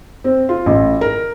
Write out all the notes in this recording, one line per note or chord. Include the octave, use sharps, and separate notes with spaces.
C4
F4
A1
A#4